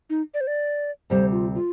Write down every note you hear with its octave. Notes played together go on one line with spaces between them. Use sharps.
D#4
D5
C5
D5
D2 C3 G3 C5
F4
F4